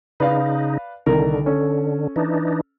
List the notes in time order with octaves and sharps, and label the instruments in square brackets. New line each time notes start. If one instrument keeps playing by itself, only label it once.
[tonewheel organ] C#3 D#4 [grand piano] B4 D5 F5
[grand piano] C2 D#3 A#4 [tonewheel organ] D3
[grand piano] C#4 A4
[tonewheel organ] E3 D4 D#4